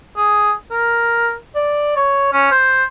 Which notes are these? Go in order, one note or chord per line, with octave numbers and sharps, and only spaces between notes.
G#4
A#4
D5
C#5
C#4
C5